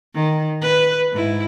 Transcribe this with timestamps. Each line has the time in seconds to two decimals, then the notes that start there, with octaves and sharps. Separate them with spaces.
0.14 D#3
0.62 B4
1.12 G#2 E4